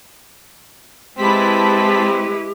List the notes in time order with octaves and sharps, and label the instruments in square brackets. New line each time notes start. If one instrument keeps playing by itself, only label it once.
[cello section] G#3 E4 B4 [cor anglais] C4 [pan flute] G4 [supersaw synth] A5 B5 B6